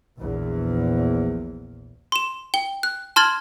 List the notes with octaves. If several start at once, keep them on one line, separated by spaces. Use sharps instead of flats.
A#1 E2
C6 E7
G5 G7
F#6
A5 C6 F6 G#6 A6 F#7